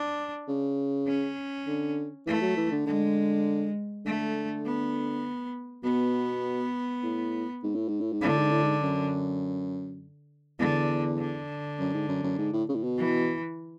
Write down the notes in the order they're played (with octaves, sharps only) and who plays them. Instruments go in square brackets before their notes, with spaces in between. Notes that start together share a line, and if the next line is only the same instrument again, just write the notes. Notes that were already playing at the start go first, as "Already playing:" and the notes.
Already playing: [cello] D4
[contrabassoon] C#3
[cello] C#4
[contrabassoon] D3
[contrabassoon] E3 [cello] A3
[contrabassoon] F#3
E3
D3
[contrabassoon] D3 [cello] G#3
[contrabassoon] D3 [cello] A3
[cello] B3
[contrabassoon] B2 [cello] B3
[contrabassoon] A2
G#2
A2
G#2
A2
G#2
[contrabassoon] A2 [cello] D3
[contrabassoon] G#2
A2
G#2
F#2
[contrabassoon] E2 [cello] D3
[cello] D3
[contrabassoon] F#2
G#2
F#2
F#2
G#2
A2
C#3
A2
B2
[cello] E3